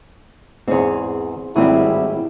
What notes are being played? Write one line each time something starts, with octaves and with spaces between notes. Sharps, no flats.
E2 G#2 C4 G#4 C#5
G#1 A2 F#3 G3 C4 E4 G#4